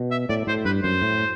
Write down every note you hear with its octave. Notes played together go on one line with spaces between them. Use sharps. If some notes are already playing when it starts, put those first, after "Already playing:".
Already playing: B2
E5
A2 D5
A2 C5
G2 B4
F#2 C5
A2